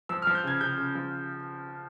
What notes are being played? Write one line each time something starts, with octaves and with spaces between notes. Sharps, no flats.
F3 E6
F3 F6
G6
C#3 G#6
C#3 G6
C#3
F3